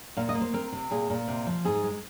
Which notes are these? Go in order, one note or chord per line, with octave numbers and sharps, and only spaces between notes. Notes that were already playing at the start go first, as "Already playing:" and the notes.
A#2 F5
D#5
A#3
C5
C4 A#4
C3
A#2 G#4
A#2
C3
F3
G#2 G#4
G#3